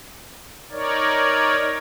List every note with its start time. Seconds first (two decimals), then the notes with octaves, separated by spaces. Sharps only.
0.72 D#4 A#4 C#5 D5